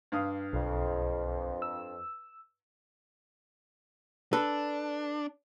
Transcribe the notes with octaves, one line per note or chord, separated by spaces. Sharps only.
G2 F5 D#6
B1 F2
E6
D4 A4 B4